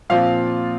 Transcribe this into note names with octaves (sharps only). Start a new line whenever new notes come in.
A#2 F3 C4 F4 F5